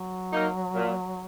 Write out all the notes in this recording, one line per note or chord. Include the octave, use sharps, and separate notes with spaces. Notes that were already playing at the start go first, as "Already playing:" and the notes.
Already playing: F#3
A#3 D#4 A#4
A#2